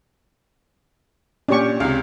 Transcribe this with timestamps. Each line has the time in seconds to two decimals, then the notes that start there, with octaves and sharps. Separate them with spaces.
1.48 A#2 C#4 D4 G4 C#6
1.80 C#2 C3 F5